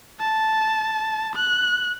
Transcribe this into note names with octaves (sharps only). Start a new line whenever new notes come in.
A5
F#6